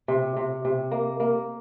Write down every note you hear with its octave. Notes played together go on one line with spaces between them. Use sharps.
C3
C3
C3
A#3
A#3